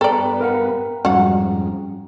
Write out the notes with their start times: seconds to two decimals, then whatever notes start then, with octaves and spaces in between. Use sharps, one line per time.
0.01 G2 B3 A4 B4 D5 G5 A#5
0.41 A#4 F5 F#5
1.05 F2 G#2 G3 C#4 F#4 F5 F#5